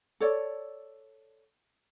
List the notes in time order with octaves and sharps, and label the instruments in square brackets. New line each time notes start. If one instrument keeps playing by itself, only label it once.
[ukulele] A4 C#5 D5